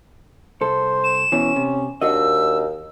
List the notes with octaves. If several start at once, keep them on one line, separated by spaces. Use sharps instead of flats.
C2 A4 C5
E7
B2 E3 C#4
C3
D#2 D4 F#4 D#5 E6